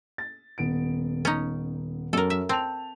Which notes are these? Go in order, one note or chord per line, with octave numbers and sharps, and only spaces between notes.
A6
D#1 B3 D7
C#4 D#4
F#2 A4 A#4
E5
C4 A5 F7